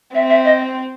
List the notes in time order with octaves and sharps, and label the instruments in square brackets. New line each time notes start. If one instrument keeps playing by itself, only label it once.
[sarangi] C4 [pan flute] E5
[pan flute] E5
D#5